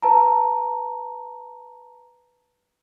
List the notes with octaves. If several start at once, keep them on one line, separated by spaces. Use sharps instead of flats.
B4 A5 A#5